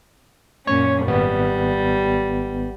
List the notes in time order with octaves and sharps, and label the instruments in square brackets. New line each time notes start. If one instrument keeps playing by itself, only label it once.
[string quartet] F#2 A#2 C#4 [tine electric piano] C#5
[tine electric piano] G#1 B3 [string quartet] G3